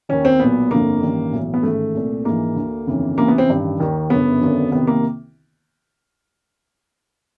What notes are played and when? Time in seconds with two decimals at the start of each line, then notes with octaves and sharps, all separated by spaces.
0.09 D#2 D#3 C#4
0.25 C4
0.40 B1 A#2 B3
0.71 G1 F2 D3 A#3
1.01 A1 G2 D#3
1.33 B1 A2 E3
1.54 B3
1.63 A1 G#2 D#3 A3
1.95 C2 A#2
2.25 A#1 G#2 E3 A#3
2.56 D2 D3
2.87 G1 F2 C#3 E3
3.18 C#2 C3 E3 A#3
3.28 B3
3.38 C4
3.49 A1 G2 D#3
3.80 D#2 D#3
4.10 G1 F#2 C#3 B3
4.42 G#1 F#2 D3
4.72 C2 C3 D#3 B3
4.87 A#3